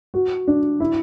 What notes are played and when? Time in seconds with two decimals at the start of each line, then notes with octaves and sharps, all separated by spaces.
0.14 F#4
0.48 D4
0.80 E4